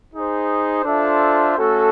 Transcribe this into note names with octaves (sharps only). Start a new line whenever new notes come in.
D#4 G#4 C5
D4 F4 A4 C5 E5
A3 C#4 F#4 A4